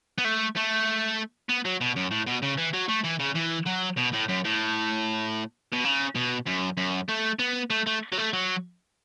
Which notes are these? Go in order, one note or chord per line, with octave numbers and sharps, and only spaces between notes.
B3
A3
A3
B3
F#3
B2
F#2
A2
B2
C#3
E3
F#3
A3
E3
C#3
E3
F#3
B2
A2
F#2
A2
B2
C#3
B2
F#2
F#2
A3
B3
A3
A3
F#3
A3
F#3